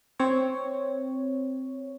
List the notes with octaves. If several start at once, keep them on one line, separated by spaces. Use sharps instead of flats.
C4 C#5